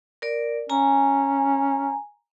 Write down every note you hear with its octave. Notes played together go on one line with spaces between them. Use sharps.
A#4 D5
C#4 G#5 A#5